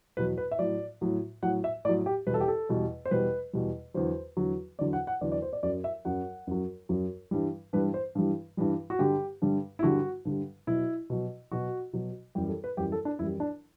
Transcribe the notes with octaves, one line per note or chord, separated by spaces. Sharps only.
E2 B2 F#3 B4
B4
E5
A2 F#3 D5
A2 F#3
A2 F#3 F#5
E5
A2 F#3 D5
G4
E2 B2 G3 B4
A4
G4
A4
E2 B2 G3
C5
E2 B2 G3 B4
E2 B2 G3
E2 D3 F#3 C5
E2 D3 F#3
E2 D3 F#3 D5
F#5
F#5
E2 D3 F#3 D5
D5
C5
D5
F#2 F#3 D5
E5
F#2 F#3 F#5
F#2 F#3
F#2 F#3
G2 E3 G3
G2 E3 G3 B4
C5
G2 E3 G3
G2 E3 G3
F#4
G2 D3 G3 G4
G2 D3 G3
E4
G2 D3 G3 F#4
G2 D3 G3
B2 F#3 E4
B2 F#3
B2 F#3 F#4
B2 F#3
F#2 E3 G3 G4
A4
B4
F#2 E3 G3 G4
A4
D4
F#2 E3 G3 E4
D4